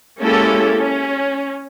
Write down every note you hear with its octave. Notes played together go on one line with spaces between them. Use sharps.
G#3 A#3 C#4 E4 G4 A4
C#4